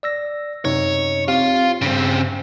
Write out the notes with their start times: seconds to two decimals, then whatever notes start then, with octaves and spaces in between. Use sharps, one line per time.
0.03 D5 E6 A#6
0.65 F#2 C3 D#4 C#5
1.28 C4 F4 G4
1.82 G2 C#3 C4